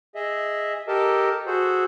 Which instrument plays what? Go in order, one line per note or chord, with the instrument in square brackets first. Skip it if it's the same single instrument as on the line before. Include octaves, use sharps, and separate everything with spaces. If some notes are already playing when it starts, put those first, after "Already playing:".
[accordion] G#4 D#5 E5
G4 A4 A#4 D#5 A5
F#4 G#4 A4 C5